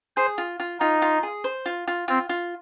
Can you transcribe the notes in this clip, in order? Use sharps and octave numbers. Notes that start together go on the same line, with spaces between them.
G#4 C5
F4
F4
D#4 F4
F4
G#4
C5
F4
F4
C4 F4
F4